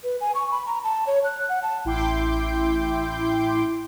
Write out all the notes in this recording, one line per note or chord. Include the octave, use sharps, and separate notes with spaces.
B4
G#5
C#6
B5
A#5
A5
C#5
F#6
F#5
A5
A1 E4 G5 C6 D6 G6